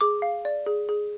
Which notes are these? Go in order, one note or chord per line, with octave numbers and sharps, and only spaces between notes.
G#4 D6
F5
D5
G#4
G#4